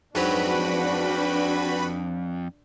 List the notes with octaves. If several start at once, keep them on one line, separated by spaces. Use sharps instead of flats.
F2 G#2 F#3 D4 F#4 B4 B5